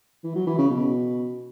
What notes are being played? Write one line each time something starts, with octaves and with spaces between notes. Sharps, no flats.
E3
F#3
E3
C#3
B2